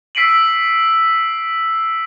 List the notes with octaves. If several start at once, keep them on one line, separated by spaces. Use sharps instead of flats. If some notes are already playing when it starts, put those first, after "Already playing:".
E6 B6 C7 D7 D#7 F#7